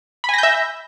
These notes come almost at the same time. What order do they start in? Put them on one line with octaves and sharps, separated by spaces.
B5 G#5 A#6 G6 E5